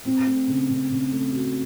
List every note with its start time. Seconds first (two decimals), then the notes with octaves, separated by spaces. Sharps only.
0.05 C4
0.26 A3
0.47 C#3
0.69 C#3
0.90 C#3
1.11 A3
1.32 F#4